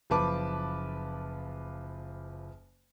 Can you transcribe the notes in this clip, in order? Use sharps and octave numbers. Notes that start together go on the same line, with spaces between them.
F#1 F3 B4 A5 D6